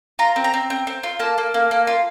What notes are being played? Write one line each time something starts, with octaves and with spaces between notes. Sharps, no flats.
F4 A#5
C4
A#5
C4
C4
C4
F4
A#3 A5
A#3
A#3
A#3
F4